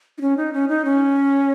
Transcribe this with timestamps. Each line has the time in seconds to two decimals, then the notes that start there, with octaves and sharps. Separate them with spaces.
0.18 D#4
0.21 C#4
0.37 D#4
0.53 C#4
0.68 D#4
0.85 C#4